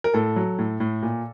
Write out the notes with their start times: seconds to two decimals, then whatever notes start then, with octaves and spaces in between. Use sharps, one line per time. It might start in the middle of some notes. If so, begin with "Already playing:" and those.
0.04 A#4
0.14 A2 A4
0.36 F#3
0.59 A2
0.80 A2
1.03 A#2